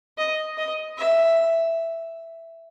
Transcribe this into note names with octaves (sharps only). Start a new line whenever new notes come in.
D#5
D#5
E5